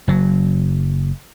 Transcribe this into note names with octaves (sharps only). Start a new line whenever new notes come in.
F#1 F#3